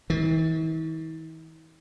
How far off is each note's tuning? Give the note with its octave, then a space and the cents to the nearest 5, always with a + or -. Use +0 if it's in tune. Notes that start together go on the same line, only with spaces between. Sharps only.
E3 -45